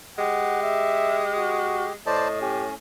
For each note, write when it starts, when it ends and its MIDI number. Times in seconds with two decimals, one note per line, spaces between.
0.18 1.94 56
0.18 1.93 67
0.18 0.62 78
0.63 1.22 76
1.37 1.88 66
2.06 2.71 45
2.06 2.28 72
2.06 2.28 74
2.06 2.39 75
2.06 2.28 81
2.41 2.75 61
2.41 2.65 67